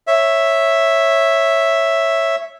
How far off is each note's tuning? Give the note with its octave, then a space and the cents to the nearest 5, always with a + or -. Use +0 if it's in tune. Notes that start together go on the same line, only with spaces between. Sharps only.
C#5 -10 E5 +0